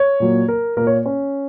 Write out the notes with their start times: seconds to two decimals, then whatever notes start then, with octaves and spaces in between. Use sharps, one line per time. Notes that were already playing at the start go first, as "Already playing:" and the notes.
Already playing: C#5
0.20 A#2 F#3 A#3
0.48 A#4
0.77 A#2 A#3 A#4
0.87 C#5
1.06 C#4